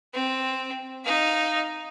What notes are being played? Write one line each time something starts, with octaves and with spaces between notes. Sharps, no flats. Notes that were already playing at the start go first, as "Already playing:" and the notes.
C4
D#4 F5